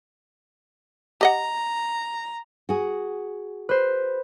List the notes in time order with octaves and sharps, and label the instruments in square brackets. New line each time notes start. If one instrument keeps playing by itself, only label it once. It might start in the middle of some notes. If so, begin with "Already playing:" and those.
[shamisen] G4 D#5 F#5 [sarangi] A#5
[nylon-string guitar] F#4 G#4
[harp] B4 C5